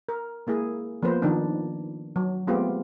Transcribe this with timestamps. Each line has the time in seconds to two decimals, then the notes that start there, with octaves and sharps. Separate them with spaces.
0.09 A#4
0.47 G#3 A#3 E4 G#4
1.03 F3 A#3 B3 B4 C5
1.22 D#3 F3 D4 D#4
2.16 F#3
2.47 G#3 A3 B3 C4 F4 G4